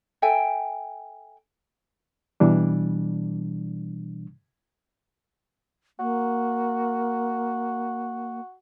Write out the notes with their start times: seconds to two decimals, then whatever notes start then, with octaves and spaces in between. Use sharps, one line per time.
0.22 A4 E5 G5 G#5
2.40 B2 E3 G3 D4
5.99 A#3 F#4